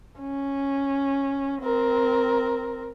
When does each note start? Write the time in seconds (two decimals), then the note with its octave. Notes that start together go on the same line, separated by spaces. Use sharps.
0.20 C#4
1.62 C4 A#4